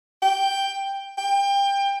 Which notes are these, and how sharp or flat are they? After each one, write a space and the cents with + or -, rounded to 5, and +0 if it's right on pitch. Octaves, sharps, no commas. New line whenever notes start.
G5 +5
G5 +25